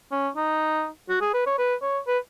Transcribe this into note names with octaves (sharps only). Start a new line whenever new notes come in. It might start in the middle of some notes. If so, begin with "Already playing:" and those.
C#4
D#4
F#4
G#4
B4
C#5
B4
C#5
B4